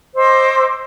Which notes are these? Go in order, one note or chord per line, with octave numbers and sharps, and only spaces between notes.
C5 D#5 D6 E6